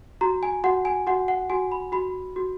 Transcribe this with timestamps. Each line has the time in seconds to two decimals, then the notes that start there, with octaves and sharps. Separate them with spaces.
0.21 F#4 A#5
0.43 G#5
0.64 F#4 F#5
0.85 G#5
1.07 F#4 F#5
1.28 F#5
1.50 F#4 G#5
1.72 B5
1.92 F#4 B5
2.36 F#4